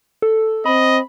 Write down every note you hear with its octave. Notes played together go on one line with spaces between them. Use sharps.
A4
C4 D#5 B5